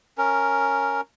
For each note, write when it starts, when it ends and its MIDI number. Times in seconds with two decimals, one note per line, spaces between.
0.18 1.01 61
0.18 1.01 70